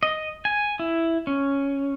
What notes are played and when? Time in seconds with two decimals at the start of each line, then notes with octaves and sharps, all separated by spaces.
0.03 D#5
0.45 G#5
0.79 E4
1.27 C#4